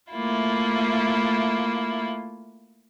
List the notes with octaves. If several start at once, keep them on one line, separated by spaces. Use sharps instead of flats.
A3 A#3 E4 F4